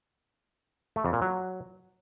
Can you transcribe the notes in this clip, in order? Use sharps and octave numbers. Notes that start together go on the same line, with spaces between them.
A3
F2
A#2
F#3